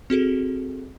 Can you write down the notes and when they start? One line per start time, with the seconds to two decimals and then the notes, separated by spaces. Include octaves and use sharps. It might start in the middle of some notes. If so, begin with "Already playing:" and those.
0.10 C4 F#4 G#4 A4